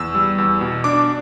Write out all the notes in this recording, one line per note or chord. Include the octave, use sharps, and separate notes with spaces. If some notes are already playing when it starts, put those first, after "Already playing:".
Already playing: E2 E6
G3
E2
B2
D4 D6